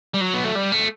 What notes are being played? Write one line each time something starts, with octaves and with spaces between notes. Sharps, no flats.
G3
F#3
B3
A3
G3
A3